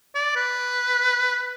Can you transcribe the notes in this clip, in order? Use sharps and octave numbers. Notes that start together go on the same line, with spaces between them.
D5
B4